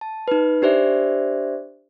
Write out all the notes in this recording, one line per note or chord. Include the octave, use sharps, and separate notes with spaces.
A5
D#4 B4
D4 G4 C5 D5 E5